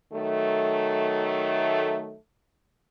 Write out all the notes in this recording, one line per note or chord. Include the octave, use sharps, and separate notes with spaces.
D#3 F#3 A3